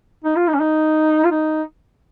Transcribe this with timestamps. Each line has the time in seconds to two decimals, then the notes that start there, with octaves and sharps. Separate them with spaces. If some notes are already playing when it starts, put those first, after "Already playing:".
0.25 D#4
0.36 F4
0.48 D#4
0.55 C#4
0.60 D#4
1.25 F4
1.31 D#4